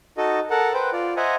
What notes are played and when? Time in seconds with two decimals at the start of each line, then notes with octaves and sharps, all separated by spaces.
0.18 D#4 F#4 A4 D#5
0.50 A4 A#4 F#5
0.74 B4 C5 G5
0.93 F4 D5
1.17 C5 D#5 E5 F#5 G#5 A#5